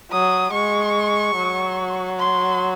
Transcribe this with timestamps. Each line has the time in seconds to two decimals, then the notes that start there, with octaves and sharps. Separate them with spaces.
0.11 F#3 D#6
0.53 G#3 C#6
1.36 F#3
2.19 C6